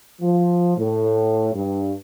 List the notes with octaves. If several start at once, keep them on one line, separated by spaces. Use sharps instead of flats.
F3
A2
G2